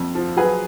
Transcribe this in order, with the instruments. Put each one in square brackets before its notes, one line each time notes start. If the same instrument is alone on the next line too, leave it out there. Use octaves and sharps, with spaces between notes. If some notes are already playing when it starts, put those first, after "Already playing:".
Already playing: [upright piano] F2 F3
F3
F#3 G#4 B4